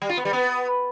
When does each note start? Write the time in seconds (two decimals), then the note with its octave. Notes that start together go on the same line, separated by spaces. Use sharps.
0.02 G3
0.09 F4
0.17 B3
0.25 G3
0.33 B3